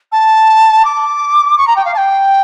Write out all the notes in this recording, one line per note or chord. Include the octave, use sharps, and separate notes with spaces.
A5
D6
C#6
A#5
G5
F5
A5
G5